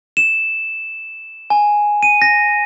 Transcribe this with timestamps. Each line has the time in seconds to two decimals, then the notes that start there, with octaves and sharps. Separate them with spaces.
0.17 E7
1.50 G#5
2.03 D#7
2.22 A#6